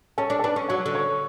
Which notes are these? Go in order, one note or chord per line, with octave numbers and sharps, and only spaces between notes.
C#4 A4
D4
A4
D4 B4
C#4
F#3 C#5
D3
C#5